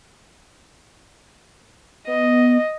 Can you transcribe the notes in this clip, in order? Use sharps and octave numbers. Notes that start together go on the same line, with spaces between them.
B3 D#5